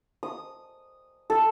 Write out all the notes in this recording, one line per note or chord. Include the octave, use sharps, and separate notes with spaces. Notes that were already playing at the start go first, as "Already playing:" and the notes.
D#6
A4